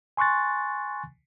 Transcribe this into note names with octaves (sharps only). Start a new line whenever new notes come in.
G#5 C6 C#6 F#6 A6